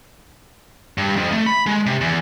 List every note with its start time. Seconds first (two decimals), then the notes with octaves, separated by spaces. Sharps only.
0.98 G2
1.16 F2
1.32 A3
1.46 B5
1.66 G#3
1.86 C3
2.01 E2